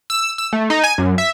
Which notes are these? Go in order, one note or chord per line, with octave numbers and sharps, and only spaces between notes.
E6
E6
A3
D#4
G#5
F#2
E5